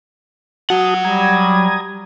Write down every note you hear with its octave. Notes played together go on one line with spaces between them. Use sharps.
F#3 F#4 F#5 A5 D#6
G3 A#5 D#6 G#6